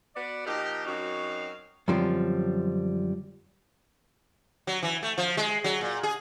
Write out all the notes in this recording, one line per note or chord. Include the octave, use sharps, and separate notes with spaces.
B3 F#4 B4 D5
A#2 F3 D#4 G4
F#2 C4 D#4 F#4 C#5 F5
F#2 D3 F3 G3 C4
F#3
E3
A3
F3
G#3
F#3
A#2
G#4